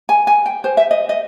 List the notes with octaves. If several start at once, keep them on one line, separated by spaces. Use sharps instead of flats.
G#5
G#5
G5
C5
E5
D#5
D#5